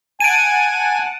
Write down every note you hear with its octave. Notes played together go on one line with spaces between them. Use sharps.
F#5 G#5 A5 D7 D#7